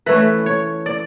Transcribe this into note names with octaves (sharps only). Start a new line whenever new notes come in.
E3 A3 C#4 B4
C#5
D5